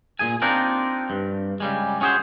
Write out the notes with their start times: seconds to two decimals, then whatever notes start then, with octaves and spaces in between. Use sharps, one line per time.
0.19 A#2 F3 G#4 G#5
0.42 C4 D4 D#4 F4 A#4
1.10 G2
1.60 C#3 G3 G#3
2.01 C#4 F#4 G#4 B4 C5